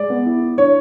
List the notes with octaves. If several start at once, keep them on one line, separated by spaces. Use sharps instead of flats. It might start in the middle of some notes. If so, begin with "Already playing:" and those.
Already playing: G#3 D5
B3
E4
E4
D4 C#5